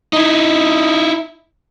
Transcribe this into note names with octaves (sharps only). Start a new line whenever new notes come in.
D#4 E4